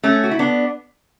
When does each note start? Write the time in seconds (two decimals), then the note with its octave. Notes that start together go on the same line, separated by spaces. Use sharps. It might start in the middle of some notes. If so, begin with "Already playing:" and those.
0.04 A3 C#4
0.24 F#4
0.31 E4
0.39 B3 D4